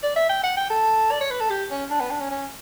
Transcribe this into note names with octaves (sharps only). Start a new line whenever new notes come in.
D5
E5
G5
F#5
G5
A4
D5
C#5
B4
A4
G4
C#4
D4
B3
D4
C#4
C#4